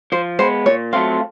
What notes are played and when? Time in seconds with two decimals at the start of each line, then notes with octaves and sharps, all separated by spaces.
0.12 F3 C5
0.39 G#3 B3 C5
0.66 A#2 C#5
0.93 F#3 A3 C4 F4 F5